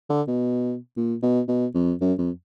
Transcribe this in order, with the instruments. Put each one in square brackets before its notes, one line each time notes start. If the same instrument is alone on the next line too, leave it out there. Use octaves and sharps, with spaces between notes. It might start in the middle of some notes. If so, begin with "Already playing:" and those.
[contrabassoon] D3
B2
A#2
B2
B2
F2
F#2
F2